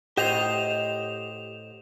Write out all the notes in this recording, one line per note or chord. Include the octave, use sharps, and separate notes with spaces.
A2 G4 C5 D#5 F#5 G5 E7 F7